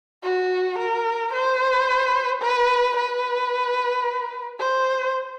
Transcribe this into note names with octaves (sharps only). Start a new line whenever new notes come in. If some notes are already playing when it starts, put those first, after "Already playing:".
F#4
A#4
C5
B4
B4
C5